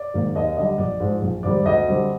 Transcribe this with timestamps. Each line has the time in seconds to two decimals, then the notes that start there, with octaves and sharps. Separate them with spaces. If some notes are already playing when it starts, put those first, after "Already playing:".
Already playing: D5
0.14 G#2 D#3 A#3
0.35 D#2 D#5
0.57 D3 G3 D#5
0.78 A#1 D5
1.00 G#2 F3
1.22 A#1
1.43 G#2 D#3 G3 C4 D5
1.65 D2 D#5
1.87 D3 G3 C4